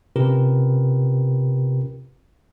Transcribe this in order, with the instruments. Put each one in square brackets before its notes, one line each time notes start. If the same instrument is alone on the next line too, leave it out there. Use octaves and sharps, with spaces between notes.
[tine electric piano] C3 C#4 F4 G4 A#4 B4